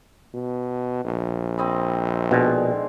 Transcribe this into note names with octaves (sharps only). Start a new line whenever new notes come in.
B2
A#1
C4 D#5 B5
B2 D3 D#3 G#3